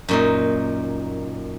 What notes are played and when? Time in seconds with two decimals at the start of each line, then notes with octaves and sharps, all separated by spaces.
0.09 F#2 A#2 D#4